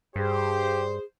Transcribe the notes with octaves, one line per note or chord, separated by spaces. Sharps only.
G2 G4 G#4 C5